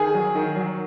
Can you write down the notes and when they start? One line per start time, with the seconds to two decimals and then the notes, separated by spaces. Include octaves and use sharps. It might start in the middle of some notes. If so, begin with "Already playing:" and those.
Already playing: D#3 G#4 G#5
0.14 F#3
0.35 D#3
0.56 F#3